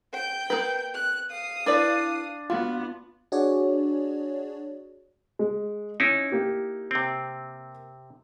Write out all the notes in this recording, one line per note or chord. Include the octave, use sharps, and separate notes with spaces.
G5 G6
A#3 B4
F#6
F5 D#6
D4 E4 B4 D5
B3 F4 F#4
D4 F#4 G#4 C#5 D5
G#3
C#4 D#4 E4
A#3 G4
C3 C4